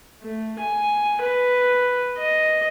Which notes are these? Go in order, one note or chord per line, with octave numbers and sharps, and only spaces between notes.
A3
G#5
B4
D#5